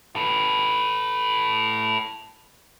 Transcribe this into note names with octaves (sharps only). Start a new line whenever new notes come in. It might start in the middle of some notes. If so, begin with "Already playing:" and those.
A4 B4